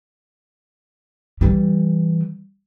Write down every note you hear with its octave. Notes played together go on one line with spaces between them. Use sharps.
E3 G3